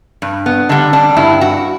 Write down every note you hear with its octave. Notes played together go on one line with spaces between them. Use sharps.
G2
B3
D3 G3 D4
D4
G2 E4
F#4